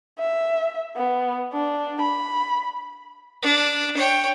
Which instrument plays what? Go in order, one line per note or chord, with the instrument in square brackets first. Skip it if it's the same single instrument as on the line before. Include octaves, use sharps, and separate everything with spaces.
[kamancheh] E5
B3
D4
B5
[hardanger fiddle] D4
C#5 G5